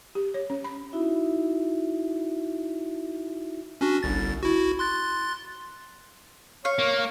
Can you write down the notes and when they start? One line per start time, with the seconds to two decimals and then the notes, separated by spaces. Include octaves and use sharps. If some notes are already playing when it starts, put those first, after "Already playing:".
0.15 G4
0.34 C#5
0.50 C#4
0.64 B5
0.93 D#4 E4 F#4 E5
3.81 C#4 D4 F#4
4.03 G1 C2 A6
4.43 E4 F#4
4.79 C6 F#6 A6
6.65 C#5 F5 C#6
6.79 A#3